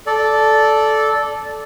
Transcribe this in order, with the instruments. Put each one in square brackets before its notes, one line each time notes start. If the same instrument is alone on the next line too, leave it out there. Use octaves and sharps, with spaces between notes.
[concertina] A4 D5